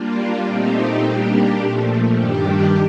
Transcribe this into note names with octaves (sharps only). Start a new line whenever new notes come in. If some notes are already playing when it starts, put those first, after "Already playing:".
Already playing: G3 A#3 D4 F4
A#2 A3 C4 D#4 G4
G3 A#3 D4 G4
A#2 F3 A3
G2 D#3 G3 D4 G4